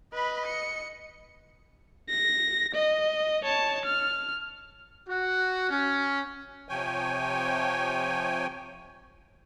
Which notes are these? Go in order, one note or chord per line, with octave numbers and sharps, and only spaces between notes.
B4 D#5 B5
C#7
A#6
D#5
C#5 A5
F6
F#4
C#4
C3 F3 C#5 G5 G#5